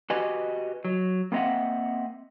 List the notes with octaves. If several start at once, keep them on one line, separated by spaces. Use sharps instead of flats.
F#4 G4 B4 D#5 G#5
F#3
A#3 C4 D#5 E5 F#5